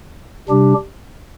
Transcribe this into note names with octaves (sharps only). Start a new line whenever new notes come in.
C3 G3 D4 G4